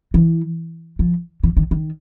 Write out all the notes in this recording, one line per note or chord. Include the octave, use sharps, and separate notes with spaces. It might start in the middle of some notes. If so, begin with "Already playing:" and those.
E3
F3
E3
D#3
D#3